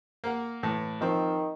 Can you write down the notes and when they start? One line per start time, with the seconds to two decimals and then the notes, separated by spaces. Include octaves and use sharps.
0.24 A#3 A#4 F#5
0.63 A2 E3 A5
1.01 D#3 F3 C4